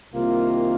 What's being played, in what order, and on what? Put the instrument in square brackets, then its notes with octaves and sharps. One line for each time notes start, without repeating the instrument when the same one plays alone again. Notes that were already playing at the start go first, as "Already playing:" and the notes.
[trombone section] C2 C3 D#3 A#3 F4